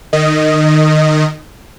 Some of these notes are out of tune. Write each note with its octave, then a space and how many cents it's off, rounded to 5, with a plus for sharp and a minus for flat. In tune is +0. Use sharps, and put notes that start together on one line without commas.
D#3 -25 D#5 +0